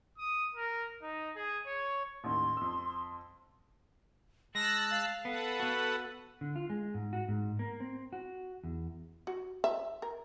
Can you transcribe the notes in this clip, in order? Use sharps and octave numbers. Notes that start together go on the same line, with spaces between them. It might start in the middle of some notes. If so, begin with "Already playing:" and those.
D#6
A#4
D#4
G#4
C#5
A1 D#2 D#3 C6
F2 E6
G#3 A5 E6 F#6 A#6
F5
B3 A4 B4 F#5
B3 F#4
D3
F4
G#3
G#2
F#4
G#2
A#3
C4
F#4
E2
F#4
E5
A#4